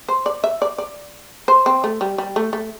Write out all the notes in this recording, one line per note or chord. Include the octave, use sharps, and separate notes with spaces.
C5
D5
E5
D5
D5
C5
C4
A3
G3
G3
A3
A3